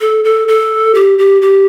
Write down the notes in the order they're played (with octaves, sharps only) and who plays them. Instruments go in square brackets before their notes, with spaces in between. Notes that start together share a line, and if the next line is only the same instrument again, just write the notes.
[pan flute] A4
A4
A4
G4
G4
G4